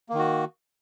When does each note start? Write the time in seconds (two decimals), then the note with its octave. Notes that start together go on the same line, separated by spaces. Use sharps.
0.09 A#3
0.14 D#3
0.19 F#4